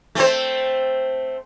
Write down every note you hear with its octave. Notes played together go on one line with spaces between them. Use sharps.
A3 C4 C5